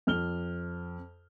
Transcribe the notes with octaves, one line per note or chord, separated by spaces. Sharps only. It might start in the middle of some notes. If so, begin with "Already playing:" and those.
F2 F6 G7